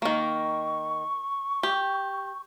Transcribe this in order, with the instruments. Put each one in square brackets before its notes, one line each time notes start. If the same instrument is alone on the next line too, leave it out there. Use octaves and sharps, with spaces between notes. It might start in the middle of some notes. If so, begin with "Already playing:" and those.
[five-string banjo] D#3 A#3 [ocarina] C#6
[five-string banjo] G4